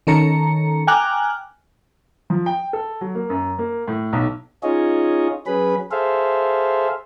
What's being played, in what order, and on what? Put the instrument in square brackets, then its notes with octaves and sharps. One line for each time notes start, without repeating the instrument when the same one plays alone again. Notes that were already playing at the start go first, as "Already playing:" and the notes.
[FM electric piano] D#3 C#4 A4 A#5 C#7
G5 G#5 A#5 D6 F6 F#6
[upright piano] F3
G5
A4
F#3
A#3
F#2
A#3
A2
B1
[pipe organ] C#4 D#4 F4 G#4 C#5 D#5
F#3 C#4 G#4 B4 B5
G#4 A4 C5 E5 F5